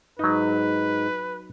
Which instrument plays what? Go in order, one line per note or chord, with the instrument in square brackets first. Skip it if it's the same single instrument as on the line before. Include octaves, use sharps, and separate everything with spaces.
[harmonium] G#2 [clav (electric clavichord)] F#3 D#4 [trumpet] B4